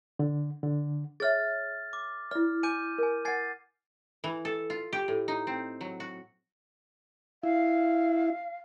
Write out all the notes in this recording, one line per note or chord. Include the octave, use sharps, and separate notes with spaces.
D3
D3
G#4 C#5 E5 F6 A6
D6
E4 D5 F6
G#5 D6 G6 D#7
A#4 G#5
F#5 G#5 G#6 A6 C7
E3
A4
F4
G4
A2
D#4
C4
F#3
F#4
E4 F5